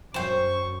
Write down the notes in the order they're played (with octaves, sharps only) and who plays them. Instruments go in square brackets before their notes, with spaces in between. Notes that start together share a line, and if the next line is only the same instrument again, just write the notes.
[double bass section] F#2 [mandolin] C5 G5 [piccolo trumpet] C#6